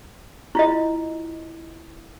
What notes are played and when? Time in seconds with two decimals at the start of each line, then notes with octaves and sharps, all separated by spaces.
0.55 E4 F4 D#5